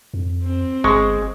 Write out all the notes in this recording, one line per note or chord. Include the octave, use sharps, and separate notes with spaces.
F2
C4
G1 G#3 C#6